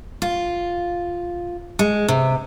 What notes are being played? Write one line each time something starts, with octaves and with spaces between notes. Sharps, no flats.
F4
G#3
C3